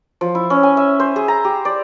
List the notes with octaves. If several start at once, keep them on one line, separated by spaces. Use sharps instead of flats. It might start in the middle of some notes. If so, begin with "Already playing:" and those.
F3
E4
C#4
G#5
E5
C5
G#4
A#5
G4
D5